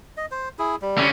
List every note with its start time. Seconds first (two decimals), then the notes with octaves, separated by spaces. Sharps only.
0.17 D#5
0.31 C5
0.59 E4 G#4
0.82 G3
0.98 D3 C#4